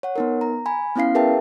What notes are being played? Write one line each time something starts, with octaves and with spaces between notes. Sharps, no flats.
C#5 F#5
B3 D#4 A#4
A#5
G#5 B5
B3 C#4 E4 F5 C7
G#4 A#4 B4 E5 G5 A5